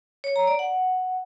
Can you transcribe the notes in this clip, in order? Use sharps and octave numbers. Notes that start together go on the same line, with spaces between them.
C#5
A#5
D5
F#5